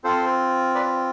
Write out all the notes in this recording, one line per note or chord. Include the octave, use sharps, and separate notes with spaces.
C4 F4 A4 C5
B4 D5